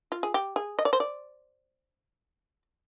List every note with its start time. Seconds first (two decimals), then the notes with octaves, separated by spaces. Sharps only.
0.12 F4
0.23 G#4
0.34 G4
0.56 G#4
0.79 D#5
0.85 D5
0.93 C5
1.00 D5